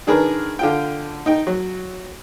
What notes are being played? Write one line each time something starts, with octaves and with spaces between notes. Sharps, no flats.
D#3 D4 G#4 A#4 B4
D3 F4 G5
D#4 G5
F#3